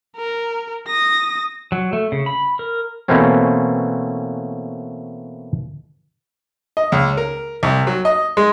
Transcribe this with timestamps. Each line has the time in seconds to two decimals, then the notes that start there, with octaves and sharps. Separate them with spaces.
0.17 A#4
0.87 D#6 A#6
1.72 F#3
1.93 A3
2.12 C#3
2.26 B5
2.59 A#4
3.08 B2 E3 A3 A#3 C4 C#4
6.77 D#5
6.92 C#2
7.17 A#4
7.63 C2
7.87 F#3
8.05 D#5
8.37 G#3